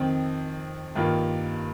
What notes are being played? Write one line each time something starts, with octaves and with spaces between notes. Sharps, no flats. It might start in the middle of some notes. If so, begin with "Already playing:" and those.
Already playing: F2 D#3 C4
G2 D#3 A#3 F4